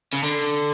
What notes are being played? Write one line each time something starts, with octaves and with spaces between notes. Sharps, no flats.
C#3
D3